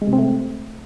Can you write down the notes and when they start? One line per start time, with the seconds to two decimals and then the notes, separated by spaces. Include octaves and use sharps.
0.02 G#3
0.07 C3
0.13 C4
0.18 A3